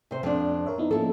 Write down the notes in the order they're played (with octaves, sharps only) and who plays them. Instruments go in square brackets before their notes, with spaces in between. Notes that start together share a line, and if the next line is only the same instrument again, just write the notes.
[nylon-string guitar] C3 C5
F2 D4
[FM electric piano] A#4 C#5 E5
B3 D#4 E4
[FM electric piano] F3 A#3 C#4 [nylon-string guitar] E4 A4